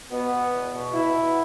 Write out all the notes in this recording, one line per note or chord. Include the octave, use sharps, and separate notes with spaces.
B2 B3
B2
E2
B2
B2 E4
B2